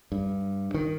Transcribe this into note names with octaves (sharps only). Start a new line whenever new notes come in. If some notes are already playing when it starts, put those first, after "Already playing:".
G2
D#3